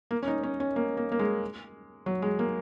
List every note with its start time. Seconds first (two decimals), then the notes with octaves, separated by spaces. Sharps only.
0.11 A#3
0.23 C#4
0.28 D#4
0.43 C#4
0.60 C#4
0.76 A#3
0.97 A#3
1.12 A#3
1.19 G#3
2.06 F#3
2.22 G#3
2.39 A#3